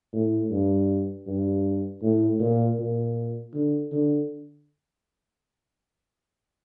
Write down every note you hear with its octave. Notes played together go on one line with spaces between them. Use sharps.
A2
G2
G2
A2
A#2
A#2
D3
D3